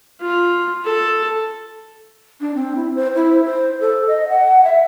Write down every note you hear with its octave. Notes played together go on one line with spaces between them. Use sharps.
F4
A4
D4
C4
E4
C5
E4
C5
A4
D#5
F#5
E5